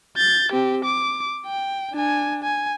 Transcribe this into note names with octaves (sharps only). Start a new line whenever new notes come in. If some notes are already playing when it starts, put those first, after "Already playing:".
G6 A6
C4 G4
D6
G5
D4 G#5
G#5